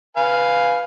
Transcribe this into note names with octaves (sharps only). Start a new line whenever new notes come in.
B4 F5 G#5